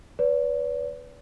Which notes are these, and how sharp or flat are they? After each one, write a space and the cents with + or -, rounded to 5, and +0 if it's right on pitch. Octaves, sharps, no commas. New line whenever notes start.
B4 +0 D5 -45